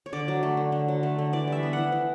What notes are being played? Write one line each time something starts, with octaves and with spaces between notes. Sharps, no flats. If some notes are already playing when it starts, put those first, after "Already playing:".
C#5
D3 D5
F#3
A3
D3
D3
F#3
A3
D3
E3 D5
G3 E5
B3
E3 F#5
E3